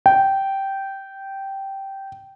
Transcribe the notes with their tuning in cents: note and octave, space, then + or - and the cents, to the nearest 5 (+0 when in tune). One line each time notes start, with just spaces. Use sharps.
G5 -10